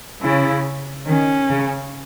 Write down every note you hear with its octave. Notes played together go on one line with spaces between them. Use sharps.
C#3 E4
D#3 C#4
C#3